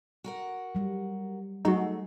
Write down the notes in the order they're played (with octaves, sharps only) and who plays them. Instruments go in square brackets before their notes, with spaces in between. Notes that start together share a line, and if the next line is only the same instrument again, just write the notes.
[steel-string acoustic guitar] F#4 A#4 F#5
[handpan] F#3 G3
[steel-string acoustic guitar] F#3 A3 [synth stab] D#4 F#4 [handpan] G#4